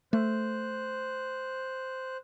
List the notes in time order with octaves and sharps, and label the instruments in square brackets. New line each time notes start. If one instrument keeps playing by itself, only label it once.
[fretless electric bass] A3 [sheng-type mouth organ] C5 F#6